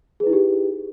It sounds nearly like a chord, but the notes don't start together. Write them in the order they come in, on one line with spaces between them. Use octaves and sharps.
G#4 B4 E4 D#4 G4